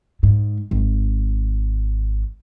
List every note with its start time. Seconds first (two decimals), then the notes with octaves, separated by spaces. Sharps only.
0.23 G#2
0.71 G#1